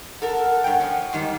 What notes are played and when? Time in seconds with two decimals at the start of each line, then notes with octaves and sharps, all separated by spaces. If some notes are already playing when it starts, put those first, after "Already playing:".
0.22 A4 A#4 F#5
0.64 G2 G5
0.80 F3 C#4
1.13 G#2 D#3 G3